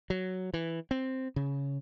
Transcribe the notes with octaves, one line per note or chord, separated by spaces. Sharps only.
F#3
E3
C4
C#3